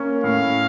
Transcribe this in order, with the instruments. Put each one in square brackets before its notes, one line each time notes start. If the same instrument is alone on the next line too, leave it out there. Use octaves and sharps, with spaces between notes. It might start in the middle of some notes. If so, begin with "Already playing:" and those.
Already playing: [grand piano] A#3 C#4
[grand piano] A2 [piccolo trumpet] F5